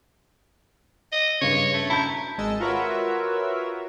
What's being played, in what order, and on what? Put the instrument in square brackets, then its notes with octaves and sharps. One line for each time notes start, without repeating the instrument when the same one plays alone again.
[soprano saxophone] D#5
[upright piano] G2 C#3 [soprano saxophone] C#5
[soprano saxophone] A3
[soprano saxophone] E4 [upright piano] A5 A#5 G6
[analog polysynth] G#1 G#3 D#5 A5 E6
F4 F#4 A#4 B4 C#5 E5